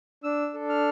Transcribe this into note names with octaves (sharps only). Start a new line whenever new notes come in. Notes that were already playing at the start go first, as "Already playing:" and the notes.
D4 E6
A4
F6